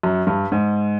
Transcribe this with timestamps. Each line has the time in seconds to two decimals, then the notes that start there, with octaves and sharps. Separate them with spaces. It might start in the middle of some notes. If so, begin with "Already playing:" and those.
0.03 F#2
0.27 G2
0.52 G#2